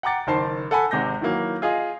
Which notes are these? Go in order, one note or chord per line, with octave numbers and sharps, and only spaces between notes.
F#5 G5 A#5 D6 A6 C#7
F#1 D#3 C5 A5 C7
A4 F#5 G#5 B5
G#1 C3 G#3 G6 A#6
D#3 E3 F#3 A#3
F4 G#4 D#5 F5